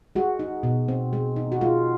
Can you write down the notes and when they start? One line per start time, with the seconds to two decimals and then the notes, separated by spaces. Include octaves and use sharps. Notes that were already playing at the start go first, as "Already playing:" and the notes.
0.15 G#3 F#4
0.39 D#4
0.63 B2
0.88 C4
1.13 G#3
1.36 D#4
1.52 F#4
1.61 G#3 F4